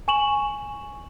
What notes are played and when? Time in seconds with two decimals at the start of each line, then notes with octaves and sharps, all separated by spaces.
0.08 G#5 C#6 E7 F#7